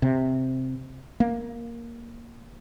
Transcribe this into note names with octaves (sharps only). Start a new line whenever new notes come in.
C3
A#3